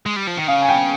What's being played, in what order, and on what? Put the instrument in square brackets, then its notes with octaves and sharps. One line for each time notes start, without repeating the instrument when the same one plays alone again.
[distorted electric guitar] G#3
G3
F3
D#3
[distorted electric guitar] C#3 [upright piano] F5
[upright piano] G#5
G5